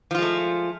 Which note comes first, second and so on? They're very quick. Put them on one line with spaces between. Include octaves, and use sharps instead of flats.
F3 F4 G#3 A3